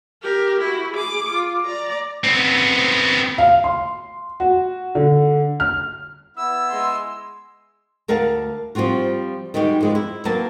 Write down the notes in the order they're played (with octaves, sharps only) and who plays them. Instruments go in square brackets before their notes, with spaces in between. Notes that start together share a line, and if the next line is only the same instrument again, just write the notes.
[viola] G4 A#4
E4 F#4
G#4 D6
F4
D5 A#5
[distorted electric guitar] B3 C4
[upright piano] F5
C6
F#4
D3
F6
[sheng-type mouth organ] B3 E4 [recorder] E6
[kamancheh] G#3 C6
[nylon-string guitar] D2 A#4 F5 F#5 A5
F3 G3 C4 F4 F#4
D#3 G3 G#3 F#4 G4
F3 G#3 B3
E4
F#3 A#3 B4 F5 A5